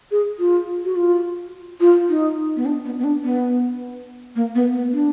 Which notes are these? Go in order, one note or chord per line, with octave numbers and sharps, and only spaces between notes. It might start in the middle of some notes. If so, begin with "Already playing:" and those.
G#4
F4
F#4
F4
F4
D#4
B3
D4
B3
B3
D4
B3
A#3
B3
B3
D4